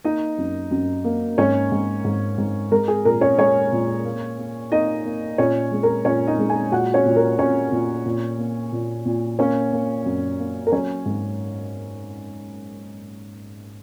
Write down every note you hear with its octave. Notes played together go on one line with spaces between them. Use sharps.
A#3 D#4 D#5
F#2
F#2
A#3
G#2 C#4 C#5
G#2
G#2
G#2
G#3 A#4
G#4
A#2 A#4
C#4 C#5
G#3 C#4 C#5
A#2
A#3
A#3
A#3 D#4 D#5
A#3
A#2 C#4 C#5
G#3
A#4
A#2 C#4 C#5
D#4 D#5
G#3
G#4 G#5
A#2 F#4 F#5
C#4 C#5
A#2
A#4
A#2 C#4 C#5
A#2
A#2
A#3
A#2
A#2
A#3 C#4 C#5
A#3
F#2
A#3
A#4
F#3 C#4 C#5
G#2